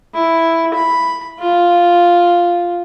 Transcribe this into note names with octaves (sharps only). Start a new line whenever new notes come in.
E4
B5
F4